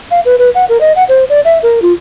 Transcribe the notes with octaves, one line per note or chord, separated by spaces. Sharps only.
F5
B4
B4
F#5
A#4
D#5
F#5
C5
D5
E5
A#4
F4